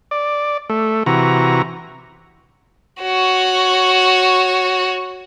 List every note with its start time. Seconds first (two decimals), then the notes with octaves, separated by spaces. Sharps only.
0.11 D5
0.69 A3
1.06 C3 E3 F#4 A#5
3.02 F#4 C#5